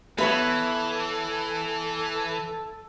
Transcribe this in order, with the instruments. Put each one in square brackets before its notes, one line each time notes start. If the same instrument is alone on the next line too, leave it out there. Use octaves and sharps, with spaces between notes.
[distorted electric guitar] E3 [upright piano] B3 E5 B5 [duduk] A4 [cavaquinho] B4 C#5